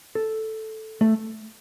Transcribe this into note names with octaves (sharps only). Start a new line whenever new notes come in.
A4
A3